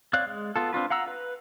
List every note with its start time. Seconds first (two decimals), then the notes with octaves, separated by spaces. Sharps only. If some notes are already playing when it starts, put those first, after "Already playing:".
0.13 C4 C#5 D5 F5 F#6
0.27 G#3
0.56 B3 F4 A4
0.73 C4 D4 F4 B4
0.90 F5 F#5 A#5 E6
1.07 B4